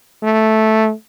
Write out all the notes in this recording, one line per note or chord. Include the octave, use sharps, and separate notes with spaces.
A3